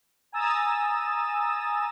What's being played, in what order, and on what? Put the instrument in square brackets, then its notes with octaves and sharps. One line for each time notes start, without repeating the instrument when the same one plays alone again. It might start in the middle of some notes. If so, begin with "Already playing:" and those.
[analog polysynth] G#5 A#5 D#6 E6 A6 E7